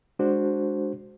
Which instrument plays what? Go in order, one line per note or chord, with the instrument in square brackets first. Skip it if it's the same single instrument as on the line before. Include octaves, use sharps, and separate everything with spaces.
[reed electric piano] G#3 D4 F#4 C5